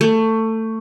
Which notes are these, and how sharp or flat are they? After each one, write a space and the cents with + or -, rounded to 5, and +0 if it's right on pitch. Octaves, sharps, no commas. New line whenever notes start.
A3 +20